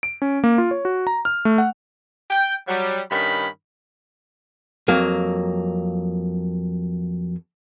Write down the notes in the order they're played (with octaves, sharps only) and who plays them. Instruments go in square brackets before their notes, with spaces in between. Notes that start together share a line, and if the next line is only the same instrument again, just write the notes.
[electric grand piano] D7
C#4
A#3
F4
C#5
F#4
A#5
F6
A3
F#5
[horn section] G5
F#3 G3
G2 D#3 C#4 B5
[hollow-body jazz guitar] F2 F#3 A#3